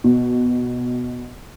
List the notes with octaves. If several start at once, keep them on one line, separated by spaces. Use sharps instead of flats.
B2